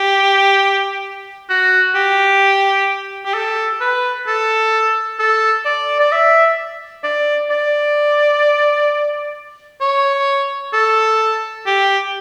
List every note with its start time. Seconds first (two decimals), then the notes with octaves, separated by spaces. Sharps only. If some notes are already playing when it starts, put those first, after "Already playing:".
Already playing: G4
1.50 F#4
1.95 G4
3.25 G4
3.34 A4
3.81 B4
4.27 A4
5.19 A4
5.65 D5
6.00 D5
6.12 E5
7.04 D5
7.50 D5
9.81 C#5
10.73 A4
11.66 G4